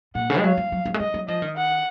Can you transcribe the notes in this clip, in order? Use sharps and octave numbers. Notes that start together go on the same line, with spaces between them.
A#2 F#5
C#3
G#3
F#3 F5
F#3
F#3
F#3
G#3
F#3 D#5
F#3
F3 D#5
D#3
F#5